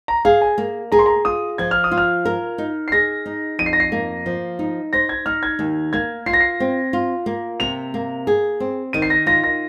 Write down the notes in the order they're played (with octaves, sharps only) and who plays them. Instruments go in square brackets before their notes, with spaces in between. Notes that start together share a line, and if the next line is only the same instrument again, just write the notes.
[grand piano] A#5
[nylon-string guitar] G#4 [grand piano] F5
[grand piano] G#5
[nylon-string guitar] A#3
[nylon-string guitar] G#4 [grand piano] A#5
[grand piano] C6
A#5
[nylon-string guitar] F4 [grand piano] D#6
[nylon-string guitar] F3 [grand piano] G#6
[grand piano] F6
D#6
[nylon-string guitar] F4
[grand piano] F6
[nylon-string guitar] A#4
D#4
[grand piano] C7
[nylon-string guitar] G#4 [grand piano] A#6
[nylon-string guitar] D#4
[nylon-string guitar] F2 [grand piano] D#7
[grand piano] C7
A#6
C7
[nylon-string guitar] A#3
F3
D#4
[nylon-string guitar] C5 [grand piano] A#6
[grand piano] G#6
[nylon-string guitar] D#4 [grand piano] F6
[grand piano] G#6
[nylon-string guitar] D#2
[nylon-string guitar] A#3 [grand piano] G#6
[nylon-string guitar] F4 [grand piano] C7
[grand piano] A#6
C7
[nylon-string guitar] C4
F4
A#3
[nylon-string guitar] C3 [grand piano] F7
[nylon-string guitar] A#3
G#4
C4
[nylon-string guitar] D#3 [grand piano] D#7
[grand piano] C7
A#6
[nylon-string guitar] F4 [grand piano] A#6
[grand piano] A#6